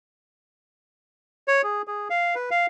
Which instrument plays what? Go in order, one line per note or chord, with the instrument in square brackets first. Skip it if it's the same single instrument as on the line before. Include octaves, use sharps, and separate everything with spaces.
[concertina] C#5
G#4
G#4
F5
B4
F5